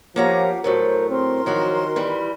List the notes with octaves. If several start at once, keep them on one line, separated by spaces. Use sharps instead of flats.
F3 A#3 C#4 G4 F5 F#5 A#5
A2 F#3 A3 A#4 C5
C4 A#4 C6
D#3 F3 F#3 F#4
E3 G3